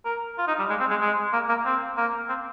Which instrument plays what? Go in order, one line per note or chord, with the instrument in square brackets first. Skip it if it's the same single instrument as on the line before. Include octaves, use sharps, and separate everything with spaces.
[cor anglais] A#4
F4
D#4
G3
G#3
C4
G#3
G#3
A#3
A#3
C4
A#3
C4